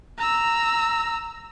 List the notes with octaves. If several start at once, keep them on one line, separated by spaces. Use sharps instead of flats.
A#5 E6